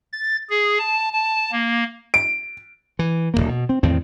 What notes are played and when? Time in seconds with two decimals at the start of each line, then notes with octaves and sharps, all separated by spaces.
0.12 A6
0.50 G#4
0.78 A5
1.13 A5
1.52 A#3
2.14 D7
2.99 E3
3.34 D1 B1 A#3
3.48 B2
3.69 C4
3.83 E2 A2 D#3 C4